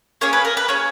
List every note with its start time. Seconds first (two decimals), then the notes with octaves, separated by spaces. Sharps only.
0.21 A#3 C#4 G#4 C#5
0.33 B4
0.45 A#4
0.57 B4
0.68 A#3 C#4 G#4 C#5